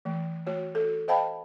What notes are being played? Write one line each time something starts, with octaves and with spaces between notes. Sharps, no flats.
E3 A3
A3 F#4 C#5
F#4 A4
C5 D#5 F5 G5 A5 B5